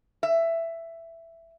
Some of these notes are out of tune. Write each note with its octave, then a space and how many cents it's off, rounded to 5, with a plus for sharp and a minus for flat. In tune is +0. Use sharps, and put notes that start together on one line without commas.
E5 +10